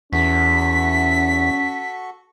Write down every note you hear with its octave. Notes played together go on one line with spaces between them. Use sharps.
E2 C#4 F#4 A4 C#6 B6